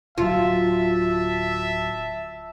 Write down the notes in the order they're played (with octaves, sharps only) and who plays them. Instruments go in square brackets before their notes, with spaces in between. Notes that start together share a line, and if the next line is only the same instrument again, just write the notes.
[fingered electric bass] D1 F#3 [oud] F4 [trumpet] E5 [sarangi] A5